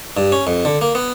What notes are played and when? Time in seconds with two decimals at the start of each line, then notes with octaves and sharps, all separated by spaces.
0.17 G2
0.32 C#4
0.47 F2
0.65 D3
0.81 A#3
0.95 B3